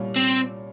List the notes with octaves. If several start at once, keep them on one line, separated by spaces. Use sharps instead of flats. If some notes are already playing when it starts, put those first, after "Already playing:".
Already playing: C2 A#2 G3 C#4 F4
C4